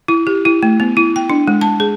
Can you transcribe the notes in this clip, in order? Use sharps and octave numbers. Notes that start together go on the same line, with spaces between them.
E4
G4
E4
A3
B3
E4
G5
D4
G#3
A5
G#4